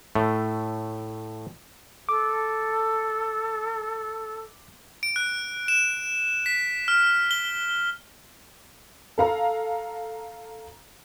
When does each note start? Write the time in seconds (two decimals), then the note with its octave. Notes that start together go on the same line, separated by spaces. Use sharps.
0.15 A2 A3
2.09 A4 D6
5.03 D7
5.16 F#6
5.68 E7
6.46 B6
6.88 F6
7.31 G7
9.18 A4 F5 A#5